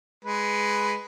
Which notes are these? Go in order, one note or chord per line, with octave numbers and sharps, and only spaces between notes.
G#3 B4